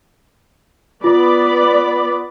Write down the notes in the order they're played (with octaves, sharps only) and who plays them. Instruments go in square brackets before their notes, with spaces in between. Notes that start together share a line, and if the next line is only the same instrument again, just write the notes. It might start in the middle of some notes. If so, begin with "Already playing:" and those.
[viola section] B3 D5 B5 [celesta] F4